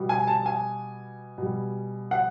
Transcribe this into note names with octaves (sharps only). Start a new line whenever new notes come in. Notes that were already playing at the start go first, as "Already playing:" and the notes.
Already playing: B2 G3
G#5
A5
G#5
B2 G3
F#5